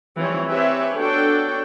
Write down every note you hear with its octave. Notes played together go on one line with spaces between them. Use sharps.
E3 F3 G3 C4 C#5
C4 G4 B4 C#5 E5 G#5
B3 D4 F#4 A4 C#5 G5